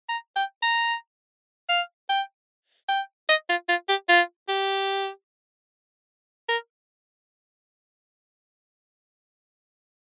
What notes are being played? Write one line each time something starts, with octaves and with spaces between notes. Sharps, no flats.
A#5
G5
A#5
F5
G5
G5
D#5
F4
F4
G4
F4
G4
A#4